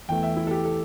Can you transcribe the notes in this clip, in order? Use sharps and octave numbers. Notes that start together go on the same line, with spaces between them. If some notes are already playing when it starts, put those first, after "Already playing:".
E2 E3 A3 G5
E5
E4
A4
G4
A4